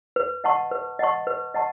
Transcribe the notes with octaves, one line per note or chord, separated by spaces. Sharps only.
B4
D#5 F#5 A5 C#6
B4
D#5 F#5 A5 C#6
B4
D#5 F#5 A5 C#6